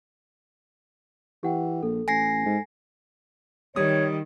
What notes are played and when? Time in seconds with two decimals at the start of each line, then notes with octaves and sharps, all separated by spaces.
1.43 E3 G4 F#5 G5
1.83 A#1 A4
2.08 A1 G#5 A#6 C7
2.45 G#2
3.76 D#3 G3 C#5 D#6